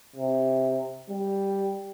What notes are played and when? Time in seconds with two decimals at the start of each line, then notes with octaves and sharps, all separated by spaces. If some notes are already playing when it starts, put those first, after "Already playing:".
0.16 C3
1.10 G3